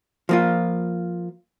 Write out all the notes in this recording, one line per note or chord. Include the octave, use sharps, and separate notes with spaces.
F3 A#3 F4